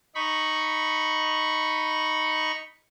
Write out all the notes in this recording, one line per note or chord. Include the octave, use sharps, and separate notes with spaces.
D#4 B5 C#6